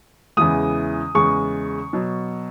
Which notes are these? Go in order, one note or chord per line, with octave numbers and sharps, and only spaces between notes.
E2 C#3 E3 G#3 D#6
E2 C#3 G#3 C#6
B2 F#3